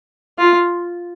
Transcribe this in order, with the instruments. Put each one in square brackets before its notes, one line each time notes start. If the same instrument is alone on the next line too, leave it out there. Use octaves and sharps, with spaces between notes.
[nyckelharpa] F4